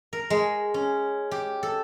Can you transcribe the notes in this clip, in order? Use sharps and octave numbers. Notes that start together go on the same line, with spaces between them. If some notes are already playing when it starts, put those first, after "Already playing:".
A#4
G#3
C#4
G4
A4